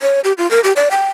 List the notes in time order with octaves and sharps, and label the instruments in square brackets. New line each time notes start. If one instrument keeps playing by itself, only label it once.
[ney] C#5
G4
F4
A#4
G4
D5
G5